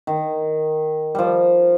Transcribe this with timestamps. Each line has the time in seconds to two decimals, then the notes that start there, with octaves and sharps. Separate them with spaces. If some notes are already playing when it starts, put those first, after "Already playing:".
0.07 D#3
1.15 F3 G3